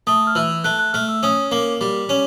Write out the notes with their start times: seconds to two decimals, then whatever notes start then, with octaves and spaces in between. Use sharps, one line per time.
0.07 A3 D#6
0.27 F6
0.35 E3 E6
0.64 A3 F#6
0.79 F#6
0.93 A3 F6
1.09 E6
1.23 C#4 D#6
1.52 A#3 D6
1.81 G3 D6
2.09 C#4